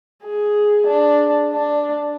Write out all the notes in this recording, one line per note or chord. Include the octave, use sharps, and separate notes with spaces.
G#4
D4
D4